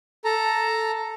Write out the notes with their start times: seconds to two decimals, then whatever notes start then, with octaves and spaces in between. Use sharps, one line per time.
0.25 A4 A#5